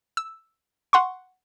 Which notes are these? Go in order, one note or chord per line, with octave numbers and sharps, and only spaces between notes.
E6
F#5 C6 C#6